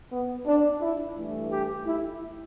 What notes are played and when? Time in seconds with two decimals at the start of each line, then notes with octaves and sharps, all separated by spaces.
0.10 B3
0.46 D4
0.81 E4
1.16 G2 E3 A3
1.52 G4
1.87 E4